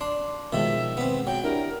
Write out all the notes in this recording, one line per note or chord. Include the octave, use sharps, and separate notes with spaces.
D4 C6
B2 D#3 F3 G#3 E5
B3 C4
F#3 G5
D4 E4 G4 A#4